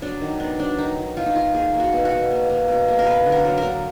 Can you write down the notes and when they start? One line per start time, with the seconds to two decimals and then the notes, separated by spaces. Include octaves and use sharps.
0.02 F#3 D4
0.21 D#3
0.40 B3 D4
0.59 F#3 D4
0.78 D#3 D#4
0.97 D#3
1.17 D#3 F4
1.26 D#4
1.35 D#3 F4
1.54 A#3 G#4
1.74 A#3
1.80 F#4
1.93 B2
2.05 F#4
2.11 B2
2.31 A#3
2.50 A#3
2.68 B2
2.88 A#3
2.99 A#4
3.07 B3 B4
3.26 D3
3.32 A#4
3.45 F#3
3.58 A#4
3.64 D3